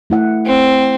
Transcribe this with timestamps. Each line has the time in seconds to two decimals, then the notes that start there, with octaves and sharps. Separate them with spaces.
0.10 A3 E4 F#5
0.46 C4